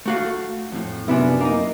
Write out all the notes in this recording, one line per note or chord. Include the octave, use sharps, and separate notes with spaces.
A3 F#4 F5
F2 A2
F#2 C3 B3 D4 E4
A#3 D#4